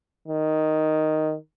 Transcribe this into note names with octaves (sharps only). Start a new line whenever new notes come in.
D#3